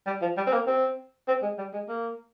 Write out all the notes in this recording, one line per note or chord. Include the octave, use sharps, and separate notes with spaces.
G3
F3
G3
C4
A#3
C4
C4
G#3
G3
G#3
A#3